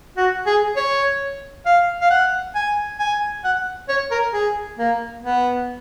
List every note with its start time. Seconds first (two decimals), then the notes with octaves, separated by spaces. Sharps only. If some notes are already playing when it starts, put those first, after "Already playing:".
0.17 F#4
0.46 G#4
0.76 C#5
1.66 F5
2.01 F5
2.10 F#5
2.55 G#5
2.99 G#5
3.44 F#5
3.89 C#5
4.11 A#4
4.33 G#4
4.78 A#3
5.23 B3